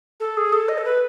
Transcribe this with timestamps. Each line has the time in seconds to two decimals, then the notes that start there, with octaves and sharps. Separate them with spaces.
0.20 A4
0.37 G#4
0.53 A4
0.69 D#5
0.78 A4
0.85 B4